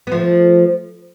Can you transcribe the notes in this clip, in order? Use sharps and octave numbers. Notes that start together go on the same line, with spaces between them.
B3
F3 A3